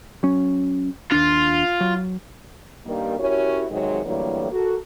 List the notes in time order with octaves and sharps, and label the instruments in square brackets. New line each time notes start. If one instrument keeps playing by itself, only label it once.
[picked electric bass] F#3 C#4
[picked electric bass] D#2 D4 [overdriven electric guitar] F4
[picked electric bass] F#3
[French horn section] G2 D#3 G3 A#3
C#4 E4 F#4 G4 A#4 C#5
G#2 C3 D#3 F#3 G#3
A2 D3 E3 F#3 G3 A#3
F#4 A4 A#4